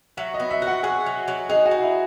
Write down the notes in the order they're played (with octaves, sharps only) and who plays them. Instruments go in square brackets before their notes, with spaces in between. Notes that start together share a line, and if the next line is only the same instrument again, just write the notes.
[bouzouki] F#3 [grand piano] E5
[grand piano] D#5
[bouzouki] B3
[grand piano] E5
[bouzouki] F#4
[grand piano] F#5
[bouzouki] F#4 [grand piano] G#4
[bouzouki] F#3
F#3
[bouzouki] D#4 [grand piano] G#4
[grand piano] F#4
[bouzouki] D#4
[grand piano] E4